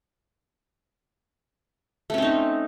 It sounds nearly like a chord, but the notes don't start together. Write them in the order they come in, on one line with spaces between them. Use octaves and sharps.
A3 C#4 C4 D#4